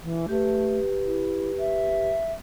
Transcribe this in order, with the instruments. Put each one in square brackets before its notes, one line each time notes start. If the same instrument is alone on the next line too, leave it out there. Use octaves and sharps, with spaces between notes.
[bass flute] E3
[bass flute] A3 [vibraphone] G4 B4
[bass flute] E4
E5